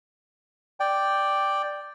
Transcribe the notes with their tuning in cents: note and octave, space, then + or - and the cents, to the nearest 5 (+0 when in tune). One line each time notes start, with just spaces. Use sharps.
D5 +0 G5 +0